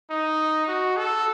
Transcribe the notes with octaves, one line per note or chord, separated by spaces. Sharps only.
D#4
F#4
A4